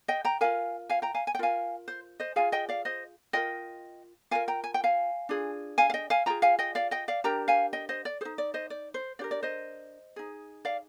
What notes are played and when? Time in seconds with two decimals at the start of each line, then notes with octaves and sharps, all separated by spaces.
0.08 D#5 G5
0.25 G5 A#5
0.41 F4 A#4 F5 G#5
0.89 F5 G#5
1.02 G5 A#5
1.14 F5 G#5
1.27 G#5
1.35 G5
1.39 F4 A#4 F5 G#5
1.88 C5
2.20 C5 D#5
2.36 F4 G#4 F5 G#5
2.52 D#5 G5
2.69 D5 F5
2.85 C5 D#5
3.33 F4 A#4 D#5 G5
4.31 F4 A#4 F5 G#5
4.48 G5 A#5
4.64 G#5
4.74 G5
4.84 F5 G#5
5.29 D4 F4 G#4
5.78 F5 G#5
5.90 F5
5.94 D#5 G5
6.10 F5 G#5
6.26 F4 G#4 G5 A#5
6.42 F5 G#5
6.59 D#5 G5
6.75 D5 F5
6.91 D#5 G5
7.08 D5 F5
7.24 D4 G4 A#4 G5 A#5
7.48 F5 G#5
7.73 D#5 G5
7.89 C5 D#5
8.05 D5
8.21 D#4 G#4 C5
8.38 D5
8.54 C5 D#5
8.70 D5
8.94 C5
9.19 D4 G4 A#4 D5
9.31 D5
9.43 C5 D#5
10.16 D#4 G#4
10.65 D5 F5